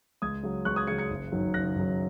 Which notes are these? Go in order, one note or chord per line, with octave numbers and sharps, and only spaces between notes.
C#2 D#6 G#6
C#3 F#3
C#2 C#6 F#6
D#6 G#6
C#3 F#3 G#6 C#7
G#6 C#7
F#1
F#2 D#3 F#3
F#1 F#6 A#6
F#2 D#3 F#3